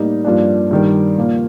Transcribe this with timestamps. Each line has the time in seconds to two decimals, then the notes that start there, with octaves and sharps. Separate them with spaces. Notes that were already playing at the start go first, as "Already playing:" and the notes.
Already playing: A2 G3 A#3 D#4
0.25 G2 F3 A#3 D4
0.71 G2 D#3 G3
1.18 A#2 F3 A#3